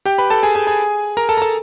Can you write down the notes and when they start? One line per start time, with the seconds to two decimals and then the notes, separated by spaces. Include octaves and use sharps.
0.05 G4 G5
0.18 B4 B5
0.30 A4 A5
0.43 G#4 G#5
0.55 G#4 G#5
0.67 G#4 G#5
1.17 A#4 A#5
1.29 A4 A5
1.37 A#5
1.42 A4 A5